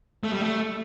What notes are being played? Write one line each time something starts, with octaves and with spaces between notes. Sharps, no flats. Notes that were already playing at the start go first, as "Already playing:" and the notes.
A3
G3
A3